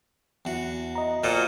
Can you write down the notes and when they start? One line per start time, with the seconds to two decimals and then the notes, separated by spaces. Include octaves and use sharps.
0.45 E2 F#4
0.95 D#5 A#5
1.24 A#2 F#4 A4 C5